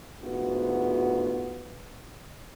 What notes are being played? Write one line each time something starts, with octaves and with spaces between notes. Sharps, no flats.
D2 G#2 B3 F4 F#4